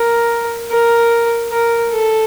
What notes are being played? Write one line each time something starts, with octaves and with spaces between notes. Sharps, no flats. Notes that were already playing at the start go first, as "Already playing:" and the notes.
Already playing: A#4
A#4
A#4
A4